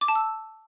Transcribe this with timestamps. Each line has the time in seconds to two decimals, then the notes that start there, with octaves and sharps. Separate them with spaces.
0.01 D6
0.08 A5
0.15 E6